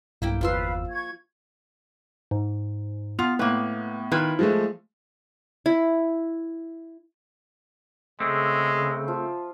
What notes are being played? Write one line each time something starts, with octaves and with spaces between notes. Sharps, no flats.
B1 G2 A#3 E4 G5
G1 E2 F3 F4 B4 F5 C6 E6
C#6 G#6
G#2
B3 F4 F7
A2 A#3 B4
D#3 E4 F4 B4
F3 G#3 A3
E4
C#3 G#3 A3 C4
F3 F4 E5